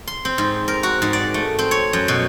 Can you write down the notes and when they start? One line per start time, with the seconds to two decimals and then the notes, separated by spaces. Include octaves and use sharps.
0.08 C6
0.25 C4
0.38 G#2
0.68 A#4
0.83 F#4
1.02 G#2
1.13 D5
1.34 A3
1.59 C4
1.71 C#5
1.93 F#2
2.08 B2